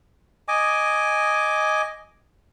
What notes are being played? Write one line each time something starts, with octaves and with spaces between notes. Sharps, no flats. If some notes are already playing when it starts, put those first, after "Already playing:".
D#5 G#5 D6